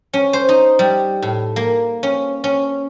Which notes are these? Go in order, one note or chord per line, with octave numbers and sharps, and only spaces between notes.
C#4
C5
D#4
G3
A2
A#3
C#4
C#4